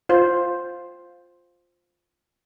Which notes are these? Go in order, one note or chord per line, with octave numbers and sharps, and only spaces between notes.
F4 C5